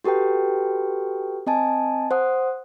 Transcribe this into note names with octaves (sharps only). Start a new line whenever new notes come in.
F#4 G4 A4 B4 G5
C4 D#5 G#5 A5
C5 F#5 D#6